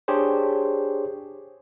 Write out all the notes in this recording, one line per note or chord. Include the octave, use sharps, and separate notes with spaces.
D4 G4 G#4 C5 C#5